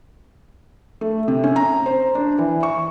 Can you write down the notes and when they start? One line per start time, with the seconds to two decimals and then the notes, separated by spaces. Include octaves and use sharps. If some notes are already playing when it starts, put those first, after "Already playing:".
1.01 A3
1.28 C3
1.44 C#4
1.56 A#5
1.86 C5
2.15 D4
2.38 E3
2.63 C#6